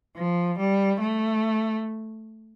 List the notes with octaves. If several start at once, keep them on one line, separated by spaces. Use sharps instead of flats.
F3
G3
A3